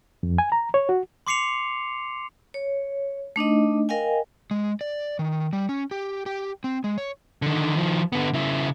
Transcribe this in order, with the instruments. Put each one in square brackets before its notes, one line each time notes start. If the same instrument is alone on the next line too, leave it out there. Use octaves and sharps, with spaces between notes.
[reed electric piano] F2
G#5
A#5
C#5
F#4
[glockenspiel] C6 D6 C7 C#7 F7
[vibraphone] C#5
A3 D4 D#4 D#5
A#4 D#5 F5 G5 G#5
[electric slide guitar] G#3
D5
D#3
G3
C#4
G4
G4
C4
G#3
C#5
[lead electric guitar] D3 D#3
D#3 F3
D3 B3
C#3 E4